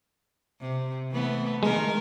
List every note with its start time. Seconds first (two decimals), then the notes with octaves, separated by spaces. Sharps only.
0.61 C3
1.12 E3 A3 B3
1.63 D#3 G#3 B3 A#4